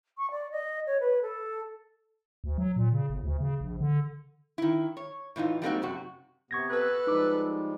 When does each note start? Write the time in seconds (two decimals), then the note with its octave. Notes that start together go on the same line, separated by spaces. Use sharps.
0.17 C#6
0.31 D5
0.51 D#5
0.86 C#5
1.00 B4
1.22 A4
2.44 D2
2.58 F#3
2.76 A#2
2.93 C#3
3.10 G1
3.24 D2
3.40 C#3
3.61 A#1
3.81 D3
4.58 D#3 E4
4.97 C#5
5.36 A2 E3 D#4 F4
5.62 G3 G#3 A#3 C4 D#4 F#4
5.82 F#2 C3 F#4
6.51 C3 B3 C#6 G#6 A#6
6.70 A4 B4
7.07 F3 G3 G#3 D#4 D6